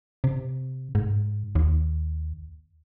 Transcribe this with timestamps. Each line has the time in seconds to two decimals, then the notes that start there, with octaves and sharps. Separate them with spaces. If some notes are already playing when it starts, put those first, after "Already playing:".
0.24 C3
0.95 G#2
1.55 D#2